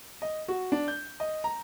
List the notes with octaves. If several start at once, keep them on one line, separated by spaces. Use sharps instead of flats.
D#5
F#4
D4
G6
D#5
A#5